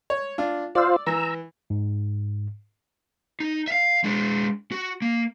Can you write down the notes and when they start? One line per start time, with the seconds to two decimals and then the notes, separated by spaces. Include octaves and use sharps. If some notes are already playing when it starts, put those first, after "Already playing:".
0.10 C#5
0.38 D4 F4
0.75 F4 C5 D5 F5 E6
1.07 E3 A#5 E6
1.70 G#2
3.40 D#4
3.68 E5 F5
4.04 G#3 D4
4.72 F#4
5.02 A#3